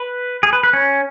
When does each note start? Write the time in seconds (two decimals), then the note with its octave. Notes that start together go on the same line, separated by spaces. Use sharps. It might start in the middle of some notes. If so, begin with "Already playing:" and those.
Already playing: B4
0.43 G#4
0.53 B4
0.63 B4
0.73 C#4